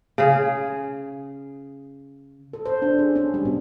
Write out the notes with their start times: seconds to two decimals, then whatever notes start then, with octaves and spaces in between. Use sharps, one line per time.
0.18 C#3 G#4
2.53 A4
2.66 C5
2.82 D4
2.99 G#4
3.16 C#4
3.34 G3
3.45 B2